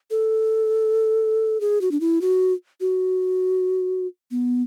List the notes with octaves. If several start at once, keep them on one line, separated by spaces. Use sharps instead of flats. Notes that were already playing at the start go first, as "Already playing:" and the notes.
A4
G#4
F#4
D4
E4
F#4
F#4
B3